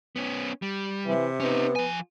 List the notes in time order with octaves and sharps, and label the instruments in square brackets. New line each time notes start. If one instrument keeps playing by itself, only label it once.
[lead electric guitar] B3 C#4
G3
[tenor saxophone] C3 [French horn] E3
[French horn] B3 [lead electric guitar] C#4 D#4
[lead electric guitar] F3 G#5